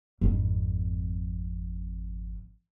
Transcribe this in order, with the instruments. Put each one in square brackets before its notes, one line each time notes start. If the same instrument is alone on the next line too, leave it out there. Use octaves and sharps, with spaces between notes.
[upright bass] G#1 F2